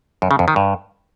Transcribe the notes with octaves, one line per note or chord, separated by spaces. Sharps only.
F#2
C#3
F2
D#3
G2